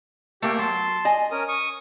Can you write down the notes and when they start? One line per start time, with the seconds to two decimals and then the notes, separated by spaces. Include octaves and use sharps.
0.42 A3 A#3 G4 G5
0.58 F#3 A5 C6
1.05 D#5 G#5
1.31 C#4 A#4 D#6
1.48 C#6 D#6